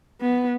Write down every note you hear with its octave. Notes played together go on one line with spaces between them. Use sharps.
B3